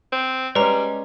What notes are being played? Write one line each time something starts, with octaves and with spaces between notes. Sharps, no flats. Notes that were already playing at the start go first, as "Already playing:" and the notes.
C4
G3 G#3 C#4 B4 A#5